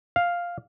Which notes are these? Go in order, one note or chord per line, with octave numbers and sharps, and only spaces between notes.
F5